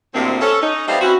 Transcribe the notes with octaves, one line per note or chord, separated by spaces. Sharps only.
D2 A2 C3 D#3 A#3 C4
C#4 A4
C#4 D#4
G3 A3 B3 C4 F5
C4 C#4 E4 F#4